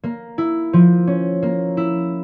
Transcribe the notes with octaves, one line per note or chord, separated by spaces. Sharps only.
A#3
E4
F3
C#4
A#3
E4